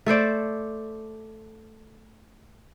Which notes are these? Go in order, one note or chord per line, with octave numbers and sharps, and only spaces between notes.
A3 A4 C5 D5